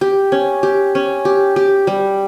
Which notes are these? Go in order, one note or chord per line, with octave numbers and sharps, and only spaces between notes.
G4
C#4
G4
C#4
G4
G4
G3